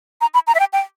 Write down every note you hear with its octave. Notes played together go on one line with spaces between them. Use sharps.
A#5
B5
A#5
E5
G5
G5